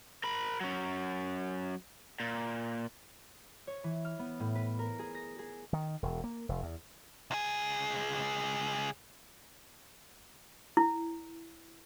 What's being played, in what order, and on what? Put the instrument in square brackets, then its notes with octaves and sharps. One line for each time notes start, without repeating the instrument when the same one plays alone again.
[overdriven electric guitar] A#4 B5
F#3 C#4
A#2
[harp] C#5
E3
F6
B3
A2
B4
A#4
G#4
A#6
G#4
[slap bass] D#3
E1
A#3
F1
E2
[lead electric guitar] C#2 G#4
[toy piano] E4